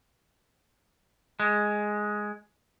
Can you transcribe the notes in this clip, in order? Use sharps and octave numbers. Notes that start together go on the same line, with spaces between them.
G#3